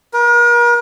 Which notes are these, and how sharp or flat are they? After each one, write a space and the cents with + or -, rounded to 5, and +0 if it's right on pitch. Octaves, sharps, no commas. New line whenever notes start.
A#4 +40